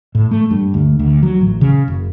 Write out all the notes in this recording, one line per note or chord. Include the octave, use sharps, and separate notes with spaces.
A2
A3
G2
D2
D2
F#3
A1
C#3
F#1